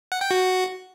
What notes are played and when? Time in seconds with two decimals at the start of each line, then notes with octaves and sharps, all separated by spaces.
0.12 F#5
0.21 G5
0.31 F#4